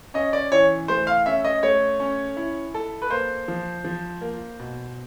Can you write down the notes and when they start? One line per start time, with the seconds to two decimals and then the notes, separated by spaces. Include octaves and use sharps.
0.14 C#4 D#5
0.33 D5
0.52 E3 C#5
0.88 A3 C5
1.07 F5
1.26 C#4 E5
1.45 D#5
1.63 A3 C#5
2.00 C#4
2.37 E4
2.74 A4
3.02 B4
3.10 A#3 C5
3.48 F3
3.84 F3
4.21 A#3
4.59 B2